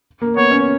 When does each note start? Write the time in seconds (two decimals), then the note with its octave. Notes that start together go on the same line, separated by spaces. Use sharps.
0.22 A#3
0.36 B3 C#5
0.51 C#4